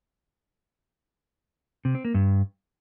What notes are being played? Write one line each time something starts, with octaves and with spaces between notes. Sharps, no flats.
C3
C4
A#3
G2